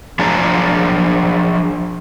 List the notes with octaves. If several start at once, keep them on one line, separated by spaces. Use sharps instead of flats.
F3 D4 G#4 A5 A#5